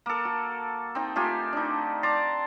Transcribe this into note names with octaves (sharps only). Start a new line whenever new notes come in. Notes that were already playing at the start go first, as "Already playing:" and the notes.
A#3 A4
F#4
C4 D#4
A3 F4 G4 G#5
D4 D#4
D5 A5 A#5 C6